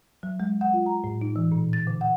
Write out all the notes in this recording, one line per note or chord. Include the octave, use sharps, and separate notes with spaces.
F#3
G#3
F#5
F4
A#5
A2
D#4
E3
A#2
A6
D3
F#5